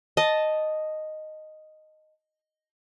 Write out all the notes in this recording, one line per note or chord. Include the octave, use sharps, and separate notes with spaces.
D#5 A5